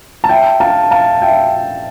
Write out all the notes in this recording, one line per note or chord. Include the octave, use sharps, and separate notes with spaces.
A5
E5 G5
F5 A5
F5 A5
E5 G5